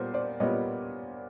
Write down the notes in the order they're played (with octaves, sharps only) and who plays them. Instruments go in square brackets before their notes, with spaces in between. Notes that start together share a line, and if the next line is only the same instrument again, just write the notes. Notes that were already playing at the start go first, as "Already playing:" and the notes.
Already playing: [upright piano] A#2 G3 B3 A#4 C5 C#5
C5 D5
A#2 G3 B3 C#5 D#5